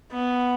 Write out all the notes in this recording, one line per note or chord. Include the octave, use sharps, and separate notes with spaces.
B3